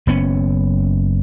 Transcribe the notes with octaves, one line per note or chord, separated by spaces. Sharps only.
F#1 B3 C#4